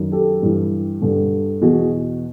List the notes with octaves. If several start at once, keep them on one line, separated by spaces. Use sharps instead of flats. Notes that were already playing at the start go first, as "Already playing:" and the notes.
Already playing: F#2 D#3
G4 A4
G2 E3
G2 D3
E2 B2 F#4 G#4